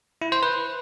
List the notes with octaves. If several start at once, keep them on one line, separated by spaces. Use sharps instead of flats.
E4
C5
B4